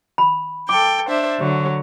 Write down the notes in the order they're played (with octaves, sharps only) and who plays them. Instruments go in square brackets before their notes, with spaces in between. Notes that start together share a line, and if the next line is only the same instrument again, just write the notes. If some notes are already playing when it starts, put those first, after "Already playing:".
[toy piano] B5
[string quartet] A4 G5 [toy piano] D6
[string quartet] D4 C5 E5
D3 F#3